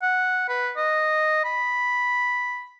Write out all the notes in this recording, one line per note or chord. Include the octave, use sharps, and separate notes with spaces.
F#5
B4
D#5
B5